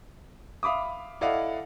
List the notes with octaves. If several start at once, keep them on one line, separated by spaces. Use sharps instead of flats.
E5 F5 B5 D6 D#6
E4 A4 D5 D#5 F5 F#5